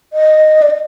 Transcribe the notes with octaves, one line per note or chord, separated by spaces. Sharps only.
D#5
D5
D#5